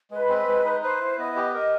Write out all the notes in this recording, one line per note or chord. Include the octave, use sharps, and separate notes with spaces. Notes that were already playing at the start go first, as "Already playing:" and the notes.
G#3 B4
C4
G#3
D#4
B4 C5
E4
B3 D#5
G4
A#4 D#5